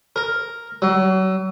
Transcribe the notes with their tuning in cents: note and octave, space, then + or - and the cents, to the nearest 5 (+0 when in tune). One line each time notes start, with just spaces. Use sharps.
A#4 +0
F#3 +35